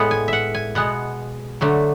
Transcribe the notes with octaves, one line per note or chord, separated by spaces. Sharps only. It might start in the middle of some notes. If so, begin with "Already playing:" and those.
Already playing: A2 G#3 B3 E5 F#5
G#5
E5 F#5
G#5
B2 G#3 B3 F#5
D3 F#3 A3